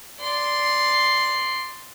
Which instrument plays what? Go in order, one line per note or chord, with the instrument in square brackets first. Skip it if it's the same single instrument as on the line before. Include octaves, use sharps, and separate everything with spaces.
[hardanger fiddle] D5 C6